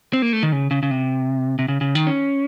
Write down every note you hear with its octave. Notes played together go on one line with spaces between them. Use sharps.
C4
A#3
A3
D#3
C#3
C#3
C#3
C3
C3
C#3
C#3
D#3
C#4